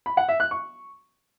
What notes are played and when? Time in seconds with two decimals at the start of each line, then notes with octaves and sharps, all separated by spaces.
0.06 B5
0.17 F#5
0.29 E5
0.40 F#6
0.51 C#6